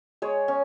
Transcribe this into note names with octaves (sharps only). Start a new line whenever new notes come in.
G#3 C#5
C#4